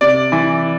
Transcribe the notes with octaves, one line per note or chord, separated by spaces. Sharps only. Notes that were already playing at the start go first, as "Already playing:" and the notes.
C3 D5
E3